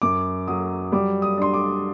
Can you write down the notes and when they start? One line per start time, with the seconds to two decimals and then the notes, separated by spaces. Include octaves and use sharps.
0.02 F#2 D6
0.48 F#3 D#6
0.92 G3 D6
1.22 D#6
1.37 D4 C6
1.54 D6